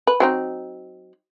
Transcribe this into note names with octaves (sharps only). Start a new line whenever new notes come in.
B4
F#3 C4 D#4